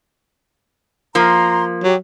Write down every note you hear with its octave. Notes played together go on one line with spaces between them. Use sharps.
F3 A#3 A#5 C6
F#3 G4